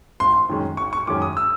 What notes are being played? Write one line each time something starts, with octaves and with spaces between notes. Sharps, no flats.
G#1 C6
F#2 D#3 G#3 C#4
G#1 C#6
C#6
F#2 D#3 G#3 C#4 D6
D#6
E6